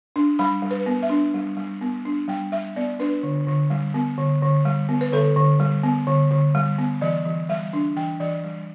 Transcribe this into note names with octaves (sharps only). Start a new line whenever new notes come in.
D4
G3 B5
G3
B4
B3
E5
D4
G3
G3
B3
D4
G3 G5
G3 E5
B3 D5
D4 B4
D3
D3
G3
B3
D3
D3
G3
B3
B4
D3 A4
D3
G3
B3
D3
D3
G3
B3
E3 D5
E3
G3 E5
D4
E3 G5
E3 D5
G3